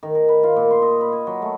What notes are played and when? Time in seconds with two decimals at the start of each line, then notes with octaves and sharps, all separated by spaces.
0.03 D#3
0.15 A#4
0.29 B4
0.43 F4
0.56 A#2
0.71 C6
0.82 D#5
1.01 B5
1.12 G#5
1.27 F#3
1.42 A3